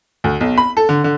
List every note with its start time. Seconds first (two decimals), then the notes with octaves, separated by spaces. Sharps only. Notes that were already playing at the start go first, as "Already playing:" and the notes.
0.24 D2
0.41 B1
0.58 B5
0.77 A4
0.89 D3
1.04 D3